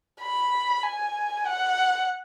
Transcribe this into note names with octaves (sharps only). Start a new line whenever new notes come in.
B5
G#5
F#5